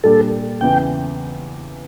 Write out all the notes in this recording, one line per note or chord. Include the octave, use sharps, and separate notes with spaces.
A#2 G3 D4 A4
E2 C#3 E3 G5